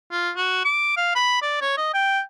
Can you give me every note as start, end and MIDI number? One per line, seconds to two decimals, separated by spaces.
0.11 0.31 65
0.36 0.62 66
0.65 0.93 86
0.97 1.11 77
1.15 1.41 83
1.42 1.60 74
1.61 1.76 73
1.77 1.93 75
1.94 2.21 79